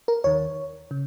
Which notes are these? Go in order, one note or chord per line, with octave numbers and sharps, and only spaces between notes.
A#4
D#2 D#3 C#5
C#3